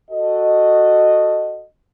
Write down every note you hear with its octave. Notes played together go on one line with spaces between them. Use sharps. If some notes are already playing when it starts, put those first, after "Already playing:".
F#4 A4 D#5